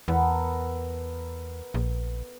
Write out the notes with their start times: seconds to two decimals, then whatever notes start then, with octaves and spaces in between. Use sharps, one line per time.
0.08 E2 B3 A4 A#4
1.74 A#1